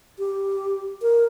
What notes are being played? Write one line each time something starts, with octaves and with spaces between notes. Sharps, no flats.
G4
A#4